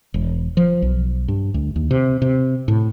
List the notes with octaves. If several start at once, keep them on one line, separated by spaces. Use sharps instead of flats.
E1
F3
B1
G2
D2
D#2
C3
C3
A2